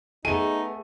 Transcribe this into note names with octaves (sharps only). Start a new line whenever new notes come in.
A3 B3 D#4 G#4 G#5 D#7